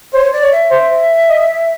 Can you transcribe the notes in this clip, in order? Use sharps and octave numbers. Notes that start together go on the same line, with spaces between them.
C5 C#5
D5
C#5
E5
C5
D#5